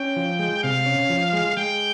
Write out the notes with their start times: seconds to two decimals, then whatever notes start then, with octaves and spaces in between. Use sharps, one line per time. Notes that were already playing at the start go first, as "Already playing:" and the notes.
Already playing: C#4 G5
0.16 F3
0.39 G#3
0.63 C3 F5
0.86 C#4
1.10 F3
1.33 G#3
1.57 G#3 G5